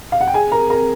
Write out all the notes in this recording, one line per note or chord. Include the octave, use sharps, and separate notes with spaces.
F5
F#5
G5
G#4 G#5
A#4 A#5
A#4 A#5